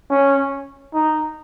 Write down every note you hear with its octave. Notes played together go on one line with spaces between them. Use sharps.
C#4
D#4